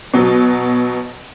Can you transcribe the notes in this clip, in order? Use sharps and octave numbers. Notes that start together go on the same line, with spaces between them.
B2 F#3